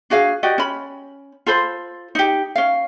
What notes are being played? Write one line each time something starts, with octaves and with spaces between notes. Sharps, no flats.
D4 F#4 G#4 F5
F#4 G4 D5 D#5
C#4 B5
F4 A4 C5 B5
D#4 G4
C#4 F5